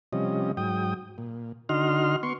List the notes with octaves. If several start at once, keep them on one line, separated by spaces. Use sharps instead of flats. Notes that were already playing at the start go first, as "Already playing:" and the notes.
C3 F3 G3 C#4 D#5
G#2 F#3 G5 D#6
A#2
D3 D#4 F#4 D#5 C6 F6
B3 C6 C#6